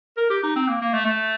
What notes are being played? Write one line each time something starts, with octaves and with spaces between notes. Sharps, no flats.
A#4
G4
D#4
C4
A#3
A#3
A3
A3